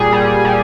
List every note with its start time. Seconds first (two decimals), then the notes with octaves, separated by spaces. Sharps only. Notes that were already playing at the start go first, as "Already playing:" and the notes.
Already playing: A#2 G3 G#4
0.13 G3
0.45 G3